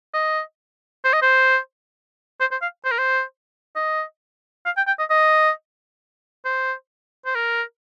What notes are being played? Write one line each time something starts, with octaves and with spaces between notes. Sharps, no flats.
D#5
C5
D#5
C5
C5
C5
F5
C5
A#4
C5
D#5
F5
G5
G5
D#5
D#5
C5
C5
A#4